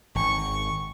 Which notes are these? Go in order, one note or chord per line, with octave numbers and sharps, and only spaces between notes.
G#1 C#6